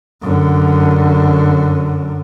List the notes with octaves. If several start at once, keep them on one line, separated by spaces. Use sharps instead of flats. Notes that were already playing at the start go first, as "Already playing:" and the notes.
F#2 D3